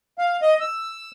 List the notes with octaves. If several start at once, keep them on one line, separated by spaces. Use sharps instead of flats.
F5
D#5
E6